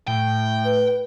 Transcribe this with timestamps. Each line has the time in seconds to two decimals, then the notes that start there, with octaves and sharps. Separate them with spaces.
0.08 A2 G5
0.65 B4